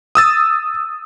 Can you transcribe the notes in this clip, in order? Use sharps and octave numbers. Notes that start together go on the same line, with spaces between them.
D#6 E6 A6